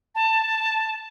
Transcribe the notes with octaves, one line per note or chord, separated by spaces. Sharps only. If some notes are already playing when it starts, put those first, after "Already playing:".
A5